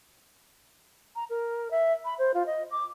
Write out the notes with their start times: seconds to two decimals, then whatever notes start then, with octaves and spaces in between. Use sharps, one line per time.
1.16 A#5
1.30 A#4
1.71 E5
2.05 B5
2.19 C5
2.34 F4
2.46 D#5
2.71 D6